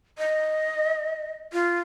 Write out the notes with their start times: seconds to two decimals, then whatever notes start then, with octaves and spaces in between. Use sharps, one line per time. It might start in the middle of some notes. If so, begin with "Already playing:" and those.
0.18 D#5
1.53 F4